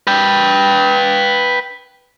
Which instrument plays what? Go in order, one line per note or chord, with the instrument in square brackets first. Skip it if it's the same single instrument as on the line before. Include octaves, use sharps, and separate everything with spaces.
[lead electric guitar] B4 G5